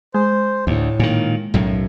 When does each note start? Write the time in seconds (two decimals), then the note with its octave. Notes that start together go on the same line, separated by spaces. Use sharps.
0.15 G#3 C5
0.67 D2 A2
1.00 A#2 D#3
1.54 B1 F#2 A2